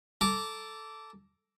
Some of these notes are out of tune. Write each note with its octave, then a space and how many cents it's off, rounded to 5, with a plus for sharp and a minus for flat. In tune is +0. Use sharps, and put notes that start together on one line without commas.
A4 +0 A#5 +0 D6 -10